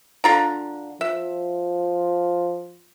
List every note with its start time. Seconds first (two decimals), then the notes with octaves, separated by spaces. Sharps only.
0.24 D3 F4 A#5
1.01 F3 E5